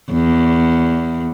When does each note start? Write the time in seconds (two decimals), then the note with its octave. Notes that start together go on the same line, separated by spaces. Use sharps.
0.12 E2